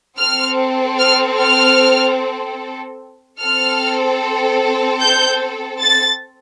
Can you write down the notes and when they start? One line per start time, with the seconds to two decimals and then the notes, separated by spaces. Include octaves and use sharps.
0.19 C4 A4 F6
0.99 F6
1.39 F6
3.40 C4 A4 F6
5.02 G6
5.81 A6